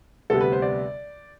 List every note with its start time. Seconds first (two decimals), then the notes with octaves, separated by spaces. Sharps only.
0.30 D2 C3 G3 B3 A4
0.41 B4
0.52 C5
0.62 D5